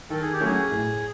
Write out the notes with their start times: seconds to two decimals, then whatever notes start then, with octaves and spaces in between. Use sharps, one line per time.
0.10 D#3 A4
0.21 G#4
0.33 G4
0.41 F#3 A3 C#4 G#4
0.71 A2